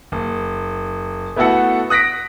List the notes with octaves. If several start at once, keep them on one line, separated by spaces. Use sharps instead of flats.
F#1
A3 B3 E4 F#4 A4 F#5
D#6 F#6 A#6 B6 D7